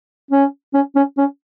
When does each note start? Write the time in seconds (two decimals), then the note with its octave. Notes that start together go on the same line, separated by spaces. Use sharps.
0.31 C#4
0.74 C#4
0.96 C#4
1.18 C#4